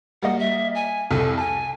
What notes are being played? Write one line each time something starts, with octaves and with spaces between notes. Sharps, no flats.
G3 A#3 D#5 F#5
E5
G#5
C2 F2 A4
G#5 A5